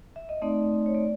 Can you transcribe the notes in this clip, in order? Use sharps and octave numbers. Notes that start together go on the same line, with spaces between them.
E5
D#5
A3 C4 D#4 D5
C#5
D5